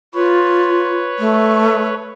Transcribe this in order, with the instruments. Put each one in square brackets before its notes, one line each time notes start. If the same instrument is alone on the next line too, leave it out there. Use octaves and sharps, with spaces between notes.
[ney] F4 [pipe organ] B4 C#5
[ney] A3